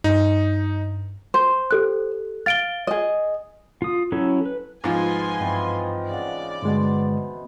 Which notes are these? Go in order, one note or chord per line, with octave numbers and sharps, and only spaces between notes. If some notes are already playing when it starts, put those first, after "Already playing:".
G2 D#4
C5
G4 A4 F#6
F5 A6 D7 G7
G#4 D#5
F4 D#6
F#3 C#4 E4 A4 C#5
B4
G#2 F3 B3 A4 G#5 C6
G2 E3 C4 D#4
C#3 D5 F#5
G2 B2 D3 G#3 C5